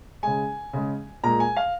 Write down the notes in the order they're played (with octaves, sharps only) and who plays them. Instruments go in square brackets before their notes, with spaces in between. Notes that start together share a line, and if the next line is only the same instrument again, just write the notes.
[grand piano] C#3 G#3 G#5
C#3 G#3
A#2 G#3 A#5
G#5
F5